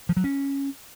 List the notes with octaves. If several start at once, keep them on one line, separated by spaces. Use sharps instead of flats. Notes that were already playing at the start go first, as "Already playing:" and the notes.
F3
F#3
C#4